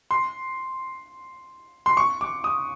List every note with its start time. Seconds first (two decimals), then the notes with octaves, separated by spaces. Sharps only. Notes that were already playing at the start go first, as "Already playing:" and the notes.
0.11 C6
1.86 C6
1.97 C#6
2.21 D6
2.44 D#6